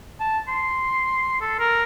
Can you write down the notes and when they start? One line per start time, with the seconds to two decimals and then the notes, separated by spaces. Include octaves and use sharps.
0.20 A5
0.48 C6
1.41 A4
1.59 A#4